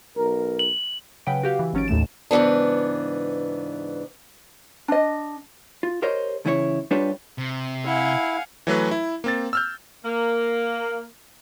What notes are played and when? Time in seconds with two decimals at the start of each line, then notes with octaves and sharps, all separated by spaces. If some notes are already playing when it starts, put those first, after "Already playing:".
0.16 B1 A#4
0.59 F#7
1.27 C#3 F#3 B4 F#5 G5 D7
1.43 F#4 G4 F5
1.59 E3
1.73 G#1 F#3 C#4 A6 D7
1.88 D#2 A2 A3 E7
2.31 G#2 C#3 E3 B3 D4
4.88 D4 D#5
5.83 F4
6.02 G4 A#4 C5 C#5 D#5
6.45 C#2 C#3 E3 E4 B4 C#5
6.91 G3 D4 F4 G4 B4 C#5
7.38 C3
7.86 E4 F5 F#5 G#5
8.67 E3 F#3 A3 B4
8.91 E4
9.24 A#3 C4 A6
9.53 E6 F6 G6
10.05 A#3